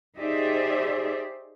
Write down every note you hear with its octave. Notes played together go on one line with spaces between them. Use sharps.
D#4 G4 G#4 C5 D5 E5